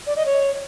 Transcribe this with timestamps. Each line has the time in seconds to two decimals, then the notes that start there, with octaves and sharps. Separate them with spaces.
0.07 D5
0.16 D#5
0.26 C#5